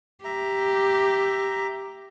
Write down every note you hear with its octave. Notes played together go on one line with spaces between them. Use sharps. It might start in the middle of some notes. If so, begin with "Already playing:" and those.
G4 E5 A#5